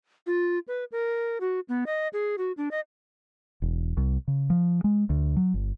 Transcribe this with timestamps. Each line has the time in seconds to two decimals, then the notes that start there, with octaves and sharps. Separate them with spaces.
0.27 F4
0.68 B4
0.92 A#4
1.41 F#4
1.69 B3
1.86 D#5
2.13 G#4
2.38 F#4
2.57 D4
2.71 D#5
3.62 E1
3.97 C2
4.28 C#3
4.50 F3
4.84 G#3
5.10 D2
5.36 F#3
5.54 G1